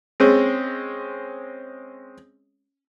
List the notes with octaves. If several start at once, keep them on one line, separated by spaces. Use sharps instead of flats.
G#3 C4 C#4